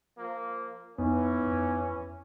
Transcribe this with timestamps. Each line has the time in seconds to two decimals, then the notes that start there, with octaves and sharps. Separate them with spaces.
0.18 F3 A#3
0.98 F2 E3 B3 C#4 D#4
1.47 F2